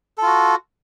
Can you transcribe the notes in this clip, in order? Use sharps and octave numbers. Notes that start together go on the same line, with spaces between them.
F4 F#4 A4